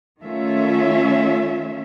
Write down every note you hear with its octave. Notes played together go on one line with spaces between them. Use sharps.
D#3 A3 C#4 F4 E5